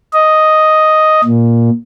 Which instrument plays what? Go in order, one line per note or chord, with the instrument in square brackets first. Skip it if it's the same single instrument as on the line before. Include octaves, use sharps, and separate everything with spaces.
[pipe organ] D#5
A#2